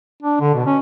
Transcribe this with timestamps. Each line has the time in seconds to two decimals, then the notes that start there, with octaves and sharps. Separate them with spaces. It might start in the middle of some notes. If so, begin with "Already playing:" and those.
0.23 D4
0.41 D3
0.55 B2
0.66 C#4